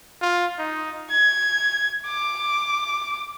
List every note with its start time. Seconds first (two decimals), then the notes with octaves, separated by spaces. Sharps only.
0.22 F4
0.58 D#4
1.10 G#6
2.07 D6